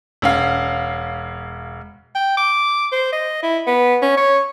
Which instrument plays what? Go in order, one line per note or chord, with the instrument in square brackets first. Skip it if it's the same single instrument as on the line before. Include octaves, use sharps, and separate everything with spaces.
[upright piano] E1 C#4 F5
[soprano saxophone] G5
D6
C5
D#5
E4
B3
C#4
C#5